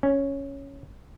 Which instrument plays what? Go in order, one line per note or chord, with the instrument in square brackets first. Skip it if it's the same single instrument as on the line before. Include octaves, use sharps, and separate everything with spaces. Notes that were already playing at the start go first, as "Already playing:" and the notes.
[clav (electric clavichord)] C#4